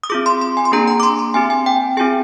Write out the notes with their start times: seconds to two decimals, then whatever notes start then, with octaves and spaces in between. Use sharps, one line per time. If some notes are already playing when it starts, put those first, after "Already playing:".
0.03 D#6
0.10 C4 F4 G#4 D6
0.26 C6
0.41 C6
0.57 G#5
0.65 C6
0.72 A#3 D4 G#4 A#5
0.87 A#5
1.00 D6
1.03 C6
1.19 C6
1.34 C4 G4 G#5
1.50 G#5
1.66 G5
1.97 C4 F4 G#4 G#5